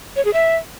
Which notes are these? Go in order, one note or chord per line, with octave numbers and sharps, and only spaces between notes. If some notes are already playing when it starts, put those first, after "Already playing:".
C#5
G#4
E5